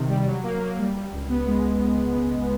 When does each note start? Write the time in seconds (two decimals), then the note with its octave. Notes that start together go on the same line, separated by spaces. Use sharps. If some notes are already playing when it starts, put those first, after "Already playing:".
Already playing: C3 D#3
0.08 G3
0.26 F#3
0.43 A#3
0.60 A#3
0.78 G3
0.94 G3
1.12 C#2
1.29 B3
1.47 G#3